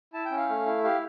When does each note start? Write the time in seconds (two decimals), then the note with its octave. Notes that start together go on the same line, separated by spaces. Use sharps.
0.13 E4 A5
0.25 G5
0.31 C#4
0.37 F5
0.49 A3
0.66 E4
0.83 G4 F5